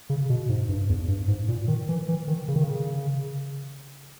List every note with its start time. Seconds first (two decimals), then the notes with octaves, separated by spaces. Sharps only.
0.10 C#3
0.30 B2
0.49 G#2
0.69 G2
0.89 E2
1.08 G2
1.28 G#2
1.48 A#2
1.68 D#3
1.89 E3
2.09 E3
2.28 D#3
2.48 C#3
2.56 D#3
2.64 C#3